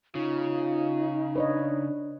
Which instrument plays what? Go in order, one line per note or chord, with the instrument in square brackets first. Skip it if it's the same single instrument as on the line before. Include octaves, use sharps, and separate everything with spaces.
[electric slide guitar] C#3 [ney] D#4 [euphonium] F4
[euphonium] D4 [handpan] B4 C#5 D#5